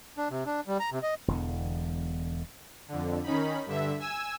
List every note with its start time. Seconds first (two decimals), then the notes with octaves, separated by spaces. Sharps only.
0.18 D4
0.30 C3
0.46 D4
0.67 G3
0.80 A#5
0.92 C3
1.03 D#5
1.28 E1 E2 D3
2.88 F2 D3
3.23 D#3 C#4 D#4 B5
3.66 G2 D3 E5
4.00 G#5 E6